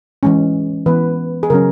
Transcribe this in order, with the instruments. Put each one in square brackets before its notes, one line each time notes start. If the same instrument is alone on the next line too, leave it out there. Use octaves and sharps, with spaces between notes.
[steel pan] E3 G#3 C#4
E3 B3 B4
G#4
C#3 F#3 C#4 A#4